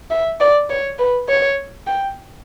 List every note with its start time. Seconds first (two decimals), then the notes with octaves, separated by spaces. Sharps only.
0.11 E5
0.40 D5
0.70 C#5
0.99 B4
1.29 C#5
1.87 G5